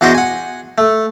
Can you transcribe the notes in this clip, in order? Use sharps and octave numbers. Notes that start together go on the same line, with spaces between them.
E2 D4 F#4 C5 D#5
F#5 G#5
A3